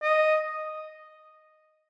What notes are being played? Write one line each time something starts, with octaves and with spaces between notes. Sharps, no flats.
D#5